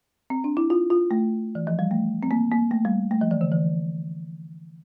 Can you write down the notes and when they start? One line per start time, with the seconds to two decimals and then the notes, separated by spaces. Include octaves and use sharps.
0.30 C4
0.44 D4
0.57 E4
0.70 F4
0.90 F4
1.11 A3
1.55 E3
1.67 F3
1.79 G3
1.91 A3
2.23 C4
2.31 A#3
2.52 A#3
2.71 A3
2.85 G3
3.11 A3
3.21 F3
3.31 E3
3.41 D3
3.52 E3